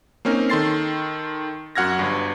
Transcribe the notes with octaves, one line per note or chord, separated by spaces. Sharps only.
A#3 C4 C#4 D#4 A#4
D#3 A4 C6 A6 C7
F#2 F#4 F#5 F6 G#6 A#6
G1 G2